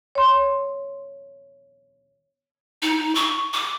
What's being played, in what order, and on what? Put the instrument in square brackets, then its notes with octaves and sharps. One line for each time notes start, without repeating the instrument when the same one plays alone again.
[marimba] C#5 C6
[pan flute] D#4
C#6
D6